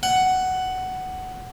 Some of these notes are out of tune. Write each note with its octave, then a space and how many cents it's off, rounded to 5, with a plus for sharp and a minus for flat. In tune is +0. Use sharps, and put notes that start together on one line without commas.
F#5 +10